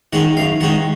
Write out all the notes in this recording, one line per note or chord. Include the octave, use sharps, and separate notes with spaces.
D#3 G#3 C#4 F#5
F#2 F5
D#3 G#3 C#4 F#5